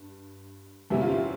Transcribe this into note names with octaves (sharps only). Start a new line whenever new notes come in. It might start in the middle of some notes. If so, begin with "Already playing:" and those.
Already playing: G2
E2 C3 G3 C#4 E4
F4
E4